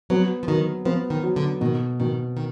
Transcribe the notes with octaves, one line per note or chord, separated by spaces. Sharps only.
F#3 B3
F3
D#3 F#3
F3 B3
D#3
F#3
D3
B2 D#3
B2 D#3
D#3